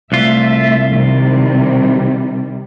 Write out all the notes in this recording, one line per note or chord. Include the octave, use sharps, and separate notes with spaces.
C2 A3 F4 E5
C3 D#3 G3